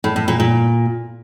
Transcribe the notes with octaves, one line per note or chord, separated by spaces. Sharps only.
A2
A2
A#2
A#2